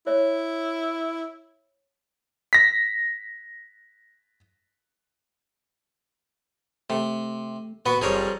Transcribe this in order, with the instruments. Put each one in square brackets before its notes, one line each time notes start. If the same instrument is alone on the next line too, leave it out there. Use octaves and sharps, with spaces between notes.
[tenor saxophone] E4 [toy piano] C#5
[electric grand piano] A#6 B6
[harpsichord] C3 [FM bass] A3
[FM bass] A#2 [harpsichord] B3 B4 [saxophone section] F#4
[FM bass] F#1 [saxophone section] F2 G3 [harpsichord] G#4 A#4 C#5